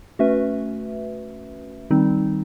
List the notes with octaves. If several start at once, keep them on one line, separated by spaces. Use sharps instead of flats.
A3 C#4 F#4 B4 E5
D#3 G3 C4 D#4